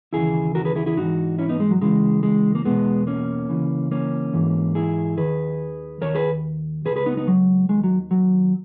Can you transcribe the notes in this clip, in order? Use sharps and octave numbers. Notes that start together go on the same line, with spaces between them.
D#2 C#3 E3 E4 G#4
F#4 A#4
G#4 B4
E4 G#4
E4 G#4
G#2 E3 D#4 F#4
C#4 E4
B3 D#4
G#3
F#3
C#2 C#3 E3 G#3
G#3
A#3
E2 B2 G#3 B3
A#3 C#4
C#2 C#3 E3
A#3 C#4
G#2 E3
E4 G#4
D#2 D#3 G#4 B4
D#2 D#3 A#4 C#5
G#4 B4
B2 G#4 B4
C#2
G#4 B4
B3 D#4
B3 D#4
F#3
D#2 D#3 G#3
F#3
F#3